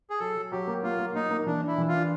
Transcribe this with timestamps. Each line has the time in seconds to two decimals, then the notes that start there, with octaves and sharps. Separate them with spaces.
0.10 G#4
0.20 F#3 A4
0.36 F#3
0.52 F#3 G4
0.67 A#3
0.83 A#3 F4
0.99 A#3
1.15 A#3 D#4
1.31 A#3
1.46 E3 D4
1.61 D4
1.67 E4
1.78 E3
1.88 F4
1.94 D4